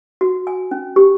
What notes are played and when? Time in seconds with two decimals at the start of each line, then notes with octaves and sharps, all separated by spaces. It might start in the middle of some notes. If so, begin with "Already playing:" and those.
0.21 F#4
0.47 G#5
0.71 C#4
0.96 G4